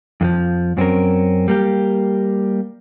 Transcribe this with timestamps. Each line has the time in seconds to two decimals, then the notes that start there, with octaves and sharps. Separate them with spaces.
0.21 F2 D3 F3
0.77 F#2 C4 C#4 A#4
1.48 G3 A#3 G4